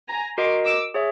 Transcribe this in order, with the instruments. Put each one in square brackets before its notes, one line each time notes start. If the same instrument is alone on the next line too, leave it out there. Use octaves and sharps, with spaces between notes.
[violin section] G#5 A#5
[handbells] F#4 A#4 D#5 [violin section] C6 D6
[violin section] D6 E6
[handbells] G#4 C#5 E5